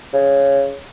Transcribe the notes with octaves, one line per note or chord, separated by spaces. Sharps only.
C#3